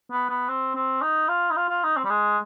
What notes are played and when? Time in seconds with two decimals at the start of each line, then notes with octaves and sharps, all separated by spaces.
0.11 B3
0.29 B3
0.48 C4
0.75 C4
1.02 D#4
1.29 F4
1.51 D#4
1.57 F4
1.69 F4
1.83 D#4
1.97 C4
2.04 G3
2.10 G#3